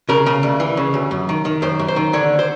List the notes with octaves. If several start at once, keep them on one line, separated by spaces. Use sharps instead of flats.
C#3 A#4
C#3
D2
E3
C#3
D2
F#2
D#3
D#3
F#2 C5
F#2
C5
D#3
D3 C#5
C5